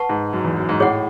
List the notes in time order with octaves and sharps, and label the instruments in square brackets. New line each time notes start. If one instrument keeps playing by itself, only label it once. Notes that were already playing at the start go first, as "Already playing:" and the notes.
Already playing: [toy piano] B4 F#5 A5 C#6
[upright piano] G#2
F#2
E2
F#2
G#2
[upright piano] A2 [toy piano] G#4 C#5 F#5